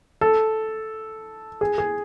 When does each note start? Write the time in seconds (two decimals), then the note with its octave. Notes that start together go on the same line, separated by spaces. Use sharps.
0.21 A4
1.61 G#4
1.78 G#4